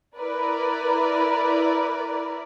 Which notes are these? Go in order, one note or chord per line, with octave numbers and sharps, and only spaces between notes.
E4 A#4 B4 D5